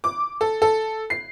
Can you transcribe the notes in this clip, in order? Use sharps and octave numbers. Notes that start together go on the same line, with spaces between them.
D6
A4
A4
C7